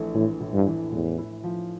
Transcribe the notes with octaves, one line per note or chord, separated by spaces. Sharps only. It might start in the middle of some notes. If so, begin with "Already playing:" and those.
Already playing: A#1 E3 A3
A2 E3
A2
G2
E3
E2 A2
E4
F3